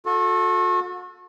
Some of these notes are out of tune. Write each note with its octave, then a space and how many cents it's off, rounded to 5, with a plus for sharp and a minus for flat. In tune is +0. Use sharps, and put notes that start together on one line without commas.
F#4 -40 A4 +0